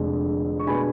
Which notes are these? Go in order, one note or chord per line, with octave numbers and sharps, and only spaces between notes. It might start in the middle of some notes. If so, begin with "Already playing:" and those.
Already playing: F1 F2 D3 G#3 D4
C#6
B2 G#3 B3 D4 G#5 B5